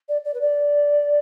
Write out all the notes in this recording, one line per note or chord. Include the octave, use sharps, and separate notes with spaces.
D5
D5
B4
D5